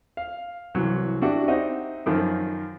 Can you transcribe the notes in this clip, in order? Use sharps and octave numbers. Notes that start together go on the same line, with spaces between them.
F5
C2 E3 F#3
D4 E4 F#4 G4
C4 D#4 D#5 E5 F#5
F#2 D#3 F3